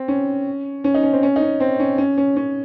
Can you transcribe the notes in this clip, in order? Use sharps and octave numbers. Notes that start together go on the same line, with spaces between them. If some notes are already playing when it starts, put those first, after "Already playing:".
Already playing: C4
C#4
C#4
D#4
C#4
C4
C#4
D#4
C#4
C4
C#4
C#4
C#4
C#4